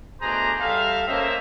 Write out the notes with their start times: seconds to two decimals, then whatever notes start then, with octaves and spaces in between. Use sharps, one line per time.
0.21 B2 A3 D4 G#4 C5 A#5
0.60 G3 A4 E5 F5
1.08 A#3 C#4 A4 C5 D#5 E5